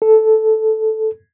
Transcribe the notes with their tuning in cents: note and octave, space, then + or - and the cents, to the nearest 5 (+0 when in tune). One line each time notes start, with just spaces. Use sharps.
A4 -5